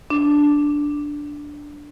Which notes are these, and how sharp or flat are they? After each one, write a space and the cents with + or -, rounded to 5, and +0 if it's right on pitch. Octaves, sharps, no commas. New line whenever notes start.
D4 +0